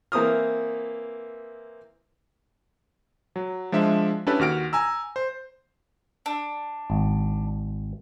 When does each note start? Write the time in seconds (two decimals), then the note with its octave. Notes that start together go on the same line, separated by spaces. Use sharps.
0.12 E3 A#3 C4 D#6 F6
3.36 F#3
3.72 F3 G#3 D4 E5
4.27 C#4 D4 E4 G4 A4 B4
4.39 D#2 F#4 F6 D7
4.73 G#5 A#5 E6
5.16 C5
6.26 D4
6.90 G#1